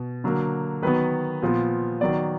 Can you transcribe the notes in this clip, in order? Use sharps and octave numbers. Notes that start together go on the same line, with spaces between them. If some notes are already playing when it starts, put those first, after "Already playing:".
Already playing: B2
D3 F#3 A#3
D#3 F#3 B3 B4
A#2 F3 B3
D#3 F#3 B3 D5